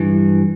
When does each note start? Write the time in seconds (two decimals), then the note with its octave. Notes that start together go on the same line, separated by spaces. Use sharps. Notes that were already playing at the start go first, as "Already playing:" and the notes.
Already playing: G2 E3